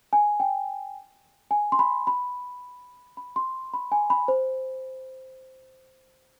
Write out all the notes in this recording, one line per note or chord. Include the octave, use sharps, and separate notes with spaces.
G#5
G5
G#5
C6
B5
B5
B5
C6
B5
G#5
B5
C5